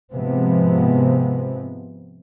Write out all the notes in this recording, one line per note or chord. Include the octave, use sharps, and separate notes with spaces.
G#2 C3 F3 G#3 B3 C4